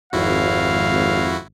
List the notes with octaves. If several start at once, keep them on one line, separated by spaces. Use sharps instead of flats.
G#1 F2 E4 F#4 F5